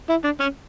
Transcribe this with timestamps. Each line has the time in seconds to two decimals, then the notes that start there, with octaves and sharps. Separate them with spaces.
0.09 E4
0.24 D4
0.40 C#4